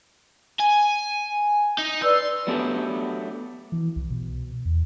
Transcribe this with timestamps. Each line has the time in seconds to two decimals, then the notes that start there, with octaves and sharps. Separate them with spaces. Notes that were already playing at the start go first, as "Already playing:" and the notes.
0.60 G#5
1.78 D#4
2.02 B4 D5 C6 E6
2.47 F#3 A3 B3 D4 G4
3.72 E3
3.96 C2
4.11 B2
4.65 E2